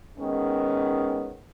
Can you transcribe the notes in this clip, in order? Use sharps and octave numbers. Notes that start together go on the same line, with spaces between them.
D#2 D#3 G#3 B3 C#4